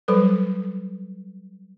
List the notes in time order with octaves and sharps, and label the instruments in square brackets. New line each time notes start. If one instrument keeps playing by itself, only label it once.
[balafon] F#3 G3 A4 B4